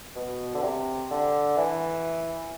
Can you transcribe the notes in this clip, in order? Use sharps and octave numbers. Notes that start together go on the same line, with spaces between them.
B2
D3
C3
D3
E3